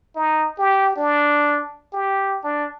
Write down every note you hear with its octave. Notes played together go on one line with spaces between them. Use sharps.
D#4
G4
D4
G4
D4